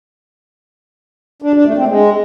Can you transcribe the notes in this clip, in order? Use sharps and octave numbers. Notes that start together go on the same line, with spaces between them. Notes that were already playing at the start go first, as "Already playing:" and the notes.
D4
D4
A3
C4
G#3